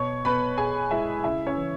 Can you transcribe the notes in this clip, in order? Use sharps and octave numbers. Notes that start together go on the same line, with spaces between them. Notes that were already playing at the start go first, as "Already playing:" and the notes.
Already playing: B2 C#5 C#6
B2 B4 B5
B2 G#4 G#5
G#3 E4 E5
C#3 E4 E5
C#4 C#5
E3